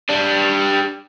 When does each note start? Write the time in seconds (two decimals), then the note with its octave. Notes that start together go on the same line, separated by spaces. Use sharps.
0.10 G3 D4